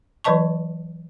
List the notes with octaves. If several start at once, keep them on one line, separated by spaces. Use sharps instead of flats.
E3 F#3 B4 D#5 A5 C#6